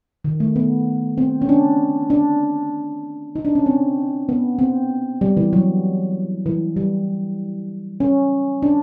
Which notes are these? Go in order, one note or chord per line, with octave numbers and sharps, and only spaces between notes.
D#3
A3
B3
C4
C#4
D4
D4
D#4
D4
C#4
C4
B3
C4
G3
E3
F#3
E3
G3
C#4
D4